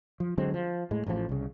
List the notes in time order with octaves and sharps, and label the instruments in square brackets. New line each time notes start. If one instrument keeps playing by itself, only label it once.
[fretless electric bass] F3
D3 F#3 G#3 C4
F3
A2 G#3
A1 A2 C#3 F3
C2 C#3